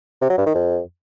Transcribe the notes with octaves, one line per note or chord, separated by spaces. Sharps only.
C3
F#3
G2
D#3
F2